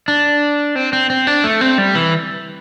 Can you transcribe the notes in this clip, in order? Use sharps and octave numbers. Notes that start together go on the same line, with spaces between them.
D4
C4
C4
C4
D4
A3
C4
G3
E3